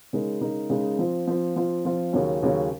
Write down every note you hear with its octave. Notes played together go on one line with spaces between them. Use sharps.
C#3 G#3 D#4 A#4
C#3 G#3 D#4 A#4
C#3 G#3 D#4 A#4
F3 C4 F4
F3 C4 F4
F3 C4 F4
F3 C4 F4
D#2 C#3 F#3 C#4
D#2 C#3 F#3 C#4